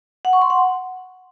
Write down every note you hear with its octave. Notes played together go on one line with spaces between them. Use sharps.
F#5
C#6
C6
F#5